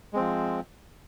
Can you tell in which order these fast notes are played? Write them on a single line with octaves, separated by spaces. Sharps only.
G#3 C4 F3